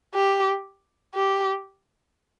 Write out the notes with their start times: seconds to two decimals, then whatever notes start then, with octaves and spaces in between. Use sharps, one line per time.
0.14 G4
1.14 G4